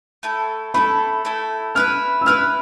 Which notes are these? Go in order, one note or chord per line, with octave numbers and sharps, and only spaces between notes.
A3 E4 A4
A3 E4 A4 B5
A3 E4 A4
E4 B4 E5 F6
E6
E4 B4 E5 F6